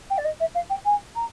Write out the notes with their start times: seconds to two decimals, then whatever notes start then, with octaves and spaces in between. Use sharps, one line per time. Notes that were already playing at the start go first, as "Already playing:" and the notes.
0.10 G5
0.18 D5
0.25 D#5
0.40 E5
0.55 F5
0.70 G5
0.85 G#5
1.16 A#5